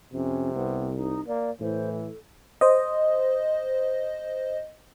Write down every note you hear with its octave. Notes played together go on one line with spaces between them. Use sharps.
F2 C3 C#4
C2 B3
D#4
A#3 D5
A2 E3 C5
A4
C5 D#5